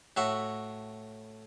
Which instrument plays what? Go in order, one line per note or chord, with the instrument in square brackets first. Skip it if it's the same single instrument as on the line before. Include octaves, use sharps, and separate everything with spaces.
[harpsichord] A2 F#4 E5